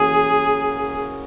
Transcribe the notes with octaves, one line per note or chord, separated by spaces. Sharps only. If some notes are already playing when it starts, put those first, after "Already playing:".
Already playing: E3 A#3 C#4 F#4 G#4